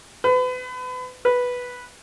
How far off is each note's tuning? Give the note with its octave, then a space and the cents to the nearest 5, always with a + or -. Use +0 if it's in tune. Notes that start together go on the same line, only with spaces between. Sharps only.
B4 +35
B4 -5